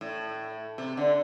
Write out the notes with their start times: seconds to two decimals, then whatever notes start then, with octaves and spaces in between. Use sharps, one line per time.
0.01 A2
0.78 C3
0.97 D3